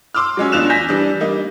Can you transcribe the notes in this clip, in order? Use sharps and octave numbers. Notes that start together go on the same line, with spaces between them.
C6 D6 E6 F6
F#3 G#3 C#4
E2 D4 F4 F#6 E7 F7
G#5 G6 A#6 B6
E3 G3 D4
G3 A#3 D#4